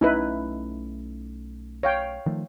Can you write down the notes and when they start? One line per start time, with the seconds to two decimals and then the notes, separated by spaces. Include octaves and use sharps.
0.01 B1 A3 C#4 D#4 E4 B4
1.83 C#5 F5 G5
2.26 D#3 F3 A3